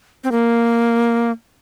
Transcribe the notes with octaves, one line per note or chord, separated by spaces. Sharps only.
C4
A#3